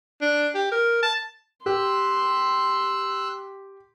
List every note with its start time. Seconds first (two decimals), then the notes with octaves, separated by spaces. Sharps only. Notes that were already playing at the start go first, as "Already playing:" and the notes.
0.21 D4
0.55 G4
0.72 A#4
1.03 A5
1.66 G4 C6 E6 F#6